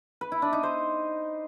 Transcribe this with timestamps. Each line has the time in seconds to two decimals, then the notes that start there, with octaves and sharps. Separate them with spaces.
0.21 B4
0.32 E4
0.42 D4
0.53 D#4
0.63 C5